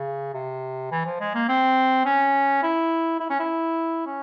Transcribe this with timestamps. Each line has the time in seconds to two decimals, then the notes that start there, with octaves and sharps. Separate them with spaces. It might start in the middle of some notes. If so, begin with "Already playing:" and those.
Already playing: C#3
0.34 C3
0.91 E3
1.06 F3
1.20 G#3
1.34 A#3
1.49 C4
2.05 C#4
2.63 E4
3.20 E4
3.30 C#4
3.39 E4
4.06 C#4